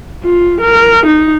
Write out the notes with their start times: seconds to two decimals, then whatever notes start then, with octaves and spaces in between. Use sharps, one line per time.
0.24 F4
0.61 A#4
1.06 D#4